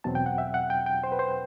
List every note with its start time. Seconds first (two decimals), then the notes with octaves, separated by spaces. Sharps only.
0.04 E2 B2 F#3 C4 A5
0.15 G5
0.26 F#5
0.38 E5
0.54 F#5
0.70 G5
0.86 G5
1.04 C5
1.12 B4
1.19 C5